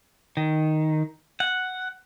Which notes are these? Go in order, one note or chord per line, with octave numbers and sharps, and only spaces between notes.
D#3
F#5